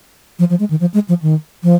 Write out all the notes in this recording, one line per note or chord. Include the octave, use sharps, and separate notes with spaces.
F3
F3
G#3
D#3
F3
G#3
F3
D#3
F3